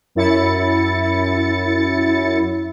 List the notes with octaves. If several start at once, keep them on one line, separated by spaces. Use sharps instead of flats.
F#2 E4 A6 C#7